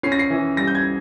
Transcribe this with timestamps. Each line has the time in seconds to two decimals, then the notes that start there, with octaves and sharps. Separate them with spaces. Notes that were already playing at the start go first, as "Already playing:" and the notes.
0.03 C#4 C7
0.12 A#6
0.19 C7
0.30 E3
0.57 G3 A#6
0.67 G6
0.75 G#6